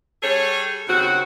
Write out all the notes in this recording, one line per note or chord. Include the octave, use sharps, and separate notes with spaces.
G3 G#4 A4 C#5
D#2 C#3 C4 F#4